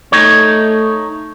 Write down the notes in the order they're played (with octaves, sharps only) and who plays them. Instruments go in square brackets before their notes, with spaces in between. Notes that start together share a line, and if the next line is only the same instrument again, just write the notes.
[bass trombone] A3 [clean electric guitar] D#4 C#5